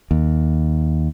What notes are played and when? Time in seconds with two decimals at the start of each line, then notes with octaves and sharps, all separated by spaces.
0.11 D#2